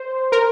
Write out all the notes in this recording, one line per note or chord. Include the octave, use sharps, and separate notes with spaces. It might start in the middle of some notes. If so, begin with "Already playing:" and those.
Already playing: C5
A#4